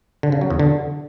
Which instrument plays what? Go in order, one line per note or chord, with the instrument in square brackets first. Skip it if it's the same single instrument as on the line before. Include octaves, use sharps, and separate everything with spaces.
[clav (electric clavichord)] D3
C#3
F#3
E2
D3